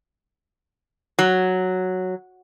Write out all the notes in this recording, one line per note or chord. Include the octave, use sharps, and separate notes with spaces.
F#3